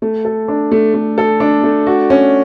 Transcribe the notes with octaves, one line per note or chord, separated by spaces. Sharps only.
A3
A4
D4
A3
A3
A4
D4
A3
F#4
C#4